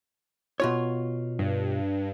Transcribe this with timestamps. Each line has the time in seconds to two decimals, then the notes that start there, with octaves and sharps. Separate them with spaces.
0.60 B2 F4 C#5
1.39 G2